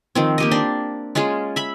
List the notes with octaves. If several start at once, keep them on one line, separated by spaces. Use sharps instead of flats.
D#3 F3 C4
A#3 G4 D#5
D4 C6
G#3 C#4 F4 G#4
E5 B5